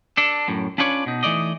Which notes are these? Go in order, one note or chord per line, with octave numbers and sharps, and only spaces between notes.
D4 A4
F#2 A2
C#4 D4 F4 B4 C#5 D5
B2 D#4
E3 A3 D#4 D5 D#5